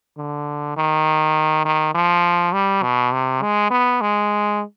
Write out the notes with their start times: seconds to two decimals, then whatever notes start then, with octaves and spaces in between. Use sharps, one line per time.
0.18 D3
0.77 D#3
1.65 D#3
1.94 F3
2.53 G3
2.83 B2
3.12 C3
3.42 G#3
3.71 B3
4.01 G#3